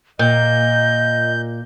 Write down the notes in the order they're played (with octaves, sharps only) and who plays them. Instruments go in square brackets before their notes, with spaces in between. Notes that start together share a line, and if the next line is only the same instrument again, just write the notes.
[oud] A#2 [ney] D#5 [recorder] G6